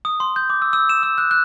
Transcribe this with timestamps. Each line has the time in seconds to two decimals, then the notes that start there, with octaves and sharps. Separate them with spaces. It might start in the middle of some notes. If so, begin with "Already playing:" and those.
0.05 D#6
0.20 C6
0.36 G6
0.50 D6
0.62 E6
0.73 E6
0.89 E7
1.03 E6
1.18 F#6
1.31 F#6